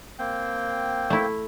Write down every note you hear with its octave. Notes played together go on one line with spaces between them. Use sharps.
A#3 C4 G5
A3 E4